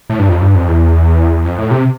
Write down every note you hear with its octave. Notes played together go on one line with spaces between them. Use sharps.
A2
G2
F2
G2
F2
E2
F2
A2
C3